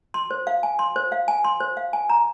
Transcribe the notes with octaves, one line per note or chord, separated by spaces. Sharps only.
C6
C5
F5
G#5
C6
C5
F5
G#5
C6
C5
F5
G#5
A#5